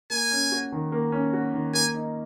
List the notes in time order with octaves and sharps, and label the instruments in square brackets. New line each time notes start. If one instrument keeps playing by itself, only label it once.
[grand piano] A#3 [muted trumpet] G#5
[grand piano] C#4
F#4
D#3
A#3
C#4
F#4
D#3
[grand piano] A#3 [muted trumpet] G#5
[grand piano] D#4